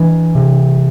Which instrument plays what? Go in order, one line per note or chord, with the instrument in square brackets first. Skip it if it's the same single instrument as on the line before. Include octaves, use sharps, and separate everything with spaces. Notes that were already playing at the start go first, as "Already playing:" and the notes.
Already playing: [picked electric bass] E3 D4
C3